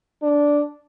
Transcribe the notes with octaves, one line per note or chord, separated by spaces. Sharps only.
D4